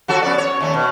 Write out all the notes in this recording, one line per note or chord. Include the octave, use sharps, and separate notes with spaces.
F3 F#4 A4
B3 C#4 D5
C#5
D#2 A3
B2